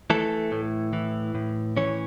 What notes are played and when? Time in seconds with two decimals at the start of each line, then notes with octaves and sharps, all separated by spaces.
0.10 E3 A3 A4
0.52 A2
0.93 E3
1.35 A2
1.77 E3 C#4 C#5